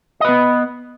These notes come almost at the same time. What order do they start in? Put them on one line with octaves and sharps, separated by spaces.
D#5 B4 B3